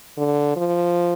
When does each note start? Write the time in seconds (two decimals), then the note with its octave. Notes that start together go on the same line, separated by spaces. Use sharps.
0.17 D3
0.56 F3